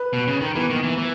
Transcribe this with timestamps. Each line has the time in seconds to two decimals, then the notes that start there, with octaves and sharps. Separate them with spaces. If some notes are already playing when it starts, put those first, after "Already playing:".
Already playing: B4
0.13 B2
0.27 C#3
0.41 D#3 A#4
0.55 E3 B3
0.70 D#3 A#3
0.84 E3
0.98 E3